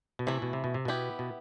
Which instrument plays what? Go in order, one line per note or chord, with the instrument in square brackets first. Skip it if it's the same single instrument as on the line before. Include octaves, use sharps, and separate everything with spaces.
[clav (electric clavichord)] B2
[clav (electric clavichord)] C3 [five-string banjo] E3 A3 E4
[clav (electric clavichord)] B2
C3
B2
C3
[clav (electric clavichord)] B2 [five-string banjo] B3 E4 G4
[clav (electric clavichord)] B2